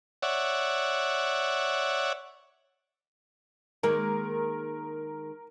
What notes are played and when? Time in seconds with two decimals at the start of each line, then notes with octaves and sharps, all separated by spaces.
0.23 C#5 D5 E5 F#5
3.83 D#3 G#3 A#3 A#4